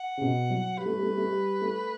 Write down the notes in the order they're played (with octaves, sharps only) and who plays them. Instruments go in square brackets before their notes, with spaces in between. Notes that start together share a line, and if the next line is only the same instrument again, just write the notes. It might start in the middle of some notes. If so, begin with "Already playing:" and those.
Already playing: [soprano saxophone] F#5
[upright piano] C#3
B2
F#3
[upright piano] G3 [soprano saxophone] B4
[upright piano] A3
G3
A3
G3
A3
G3
A3